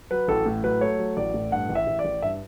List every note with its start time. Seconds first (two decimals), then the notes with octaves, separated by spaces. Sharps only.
0.11 F#3 B4
0.28 A1 A4
0.46 A2
0.64 F#3 B4
0.81 A3 C#5
0.99 F#3
1.17 A1 D5
1.34 A2
1.52 G2 F#5
1.69 A1
1.75 E5
1.87 A1
1.99 D5
2.05 A1
2.22 G2 E5